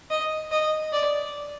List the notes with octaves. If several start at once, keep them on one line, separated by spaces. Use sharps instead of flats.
D#5
D#5
D5